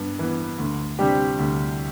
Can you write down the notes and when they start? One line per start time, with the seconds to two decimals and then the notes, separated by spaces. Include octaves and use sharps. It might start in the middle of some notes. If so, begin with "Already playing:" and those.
Already playing: G2 B3
0.19 E3 B3
0.58 D2
0.99 C3 G3 D4 G4
1.39 D2